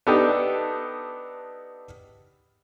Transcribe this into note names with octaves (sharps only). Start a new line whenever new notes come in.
B3 D4 D#4 G4 A4